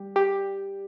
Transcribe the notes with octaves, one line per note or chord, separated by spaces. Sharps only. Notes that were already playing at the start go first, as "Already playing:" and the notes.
Already playing: G3 G4
G4